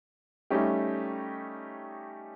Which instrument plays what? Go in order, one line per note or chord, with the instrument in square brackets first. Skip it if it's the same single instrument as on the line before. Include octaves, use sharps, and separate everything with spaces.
[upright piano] G3 A3 C#4 D#4 G4